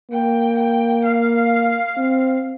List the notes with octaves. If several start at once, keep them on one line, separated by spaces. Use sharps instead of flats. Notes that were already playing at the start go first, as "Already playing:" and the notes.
A#3 G5
G5
F5
C4